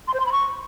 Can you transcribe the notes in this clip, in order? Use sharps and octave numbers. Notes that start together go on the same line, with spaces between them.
C6
C5
C6
B5
C#6